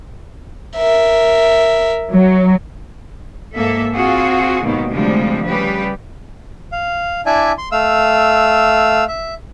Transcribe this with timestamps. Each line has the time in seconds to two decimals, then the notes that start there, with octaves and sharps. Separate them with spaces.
0.77 A#4 E5
2.13 F#3
3.55 G#2 A#3 A4 E5
3.94 C4 F4 F#4 G#4
4.62 D#2 G#2 B2 D#3
4.91 D2 C3 F3 G3 G#3 D4
5.48 C#3 G3 G4 B4
6.72 F5
7.26 D4 E4 D5 E5 G#5
7.58 C6
7.72 A3 F5 E6
9.08 E5